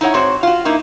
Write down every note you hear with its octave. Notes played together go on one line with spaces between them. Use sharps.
D#4 E4 C#5 F#5
G#2 C4 F#4 C#5
F4 F#4
A#3 D#4 E4